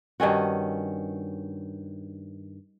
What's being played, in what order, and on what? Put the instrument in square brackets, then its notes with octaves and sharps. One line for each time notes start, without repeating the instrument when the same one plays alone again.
[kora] G2 D#3 C#4 F#4